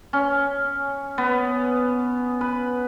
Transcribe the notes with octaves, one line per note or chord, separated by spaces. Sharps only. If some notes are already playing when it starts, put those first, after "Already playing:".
C#4
B3
B4